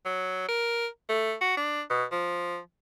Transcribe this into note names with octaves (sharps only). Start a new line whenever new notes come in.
F#3
A#4
A3
F#4
D4
B2
F3